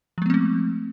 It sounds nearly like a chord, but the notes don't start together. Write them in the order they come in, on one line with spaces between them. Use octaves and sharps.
F3 G#3 B3 C4 A3